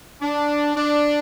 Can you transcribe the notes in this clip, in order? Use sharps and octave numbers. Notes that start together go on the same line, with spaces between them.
D4
D4